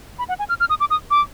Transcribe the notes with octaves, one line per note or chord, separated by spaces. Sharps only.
B5
F#5
G#5
F6
F6
D#6
D6
D#6
D6